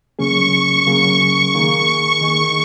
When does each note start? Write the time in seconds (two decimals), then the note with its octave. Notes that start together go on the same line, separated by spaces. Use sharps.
0.18 C#3 F#3 A#3 C#4 G#4 C#6
0.86 C#3 F#3 A#3 C#4 G#4
1.54 D#3 A#3 D#4 G#4 C#6
2.21 D#3 A#3 D#4 G#4